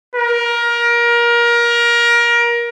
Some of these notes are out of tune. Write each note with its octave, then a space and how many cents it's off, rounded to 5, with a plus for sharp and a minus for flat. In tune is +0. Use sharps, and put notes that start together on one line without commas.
A#4 +25